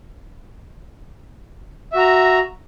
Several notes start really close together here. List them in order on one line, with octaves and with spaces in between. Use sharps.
E5 F#4 A#5